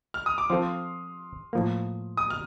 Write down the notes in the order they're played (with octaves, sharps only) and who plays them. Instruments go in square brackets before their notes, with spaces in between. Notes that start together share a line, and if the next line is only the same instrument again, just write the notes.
[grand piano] F6
D#6
D6
[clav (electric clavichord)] F3 C4 F4 A4 C5 [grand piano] C6
[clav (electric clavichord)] A2 F3 A#3
[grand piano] D#6
F6